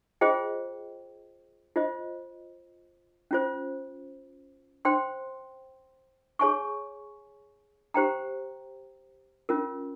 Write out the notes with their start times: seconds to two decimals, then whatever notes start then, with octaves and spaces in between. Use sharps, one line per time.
0.21 F4 G#4 C5 D#5 G5
1.76 F4 C5 D#5
3.31 C#4 F4 C5
4.85 C5 G5 C6
6.39 G#4 C#5 G#5 C#6
7.94 G4 C5 G5 A#5
9.49 C#4 F4 A#4